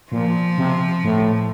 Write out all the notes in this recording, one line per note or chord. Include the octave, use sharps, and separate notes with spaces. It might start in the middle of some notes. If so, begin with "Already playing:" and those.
A#2 F3
C3
A2